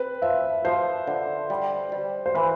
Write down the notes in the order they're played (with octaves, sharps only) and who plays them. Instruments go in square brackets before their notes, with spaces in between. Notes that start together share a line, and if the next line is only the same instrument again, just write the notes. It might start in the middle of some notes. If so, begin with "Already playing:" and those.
Already playing: [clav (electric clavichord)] C4 [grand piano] B4
[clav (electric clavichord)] F3 [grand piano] E5
[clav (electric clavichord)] F3 [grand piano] C5
[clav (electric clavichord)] D3
G3
G3
[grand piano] C5
[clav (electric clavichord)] E3 [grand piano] B4